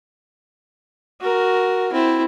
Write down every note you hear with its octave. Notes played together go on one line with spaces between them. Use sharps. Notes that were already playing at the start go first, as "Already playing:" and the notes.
F#4 A#4
C4 E4